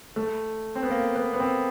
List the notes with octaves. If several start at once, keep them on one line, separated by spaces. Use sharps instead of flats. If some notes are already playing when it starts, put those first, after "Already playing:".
A3
C4
B3
A#3
B3
B3
C4